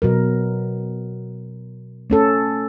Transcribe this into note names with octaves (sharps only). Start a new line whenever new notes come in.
B2 F#3 A#4
A3 C#4 A4